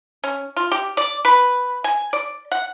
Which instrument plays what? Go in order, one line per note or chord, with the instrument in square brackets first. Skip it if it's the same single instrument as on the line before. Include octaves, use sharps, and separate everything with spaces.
[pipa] C#4
F4
G4
D5
B4
G#5
D5
F#5